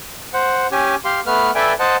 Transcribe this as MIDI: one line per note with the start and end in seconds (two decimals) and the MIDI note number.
0.34 0.67 72
0.34 0.67 78
0.72 0.95 61
0.72 0.95 67
0.72 0.95 80
1.05 1.20 67
1.05 1.20 77
1.05 1.20 84
1.26 1.51 57
1.26 1.51 59
1.26 1.51 71
1.26 1.51 89
1.55 1.73 69
1.55 1.73 71
1.55 1.73 74
1.55 1.73 76
1.55 1.73 79
1.55 1.73 80
1.80 1.96 72
1.80 1.96 75
1.80 1.96 78
1.80 1.96 81